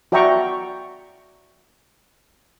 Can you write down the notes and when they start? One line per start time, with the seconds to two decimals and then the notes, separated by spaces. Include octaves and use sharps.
0.12 F#4 D5 E5 G5 A#5 C#6